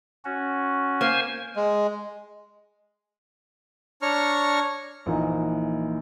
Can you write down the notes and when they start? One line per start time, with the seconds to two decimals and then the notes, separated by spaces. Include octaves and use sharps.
0.25 C#4 F#4
1.01 A#3 C5 G#5
1.56 G#3
4.02 D4 C#5 A#5 C#6 F6
5.06 A#1 E3 A#3 D#4